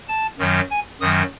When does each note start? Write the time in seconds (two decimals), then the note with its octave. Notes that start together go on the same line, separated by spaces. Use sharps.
0.08 A5
0.38 F#2 D#3 F#3
0.70 G#5
1.01 F#2 D#3 F#3 D#6